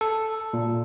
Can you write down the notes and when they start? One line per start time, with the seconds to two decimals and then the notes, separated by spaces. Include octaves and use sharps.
0.01 A4
0.53 A#2